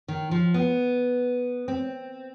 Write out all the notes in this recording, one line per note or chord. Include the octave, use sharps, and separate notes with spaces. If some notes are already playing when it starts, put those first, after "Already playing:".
D#3
F3
B3
C4